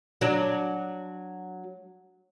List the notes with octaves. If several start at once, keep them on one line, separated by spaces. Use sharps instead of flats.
F#3 D4